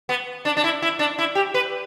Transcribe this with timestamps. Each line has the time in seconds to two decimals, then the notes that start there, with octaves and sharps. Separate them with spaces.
0.09 B3
0.45 D4
0.57 D4
0.64 E4
0.82 E4
0.99 D4
1.18 E4
1.35 G4
1.54 B4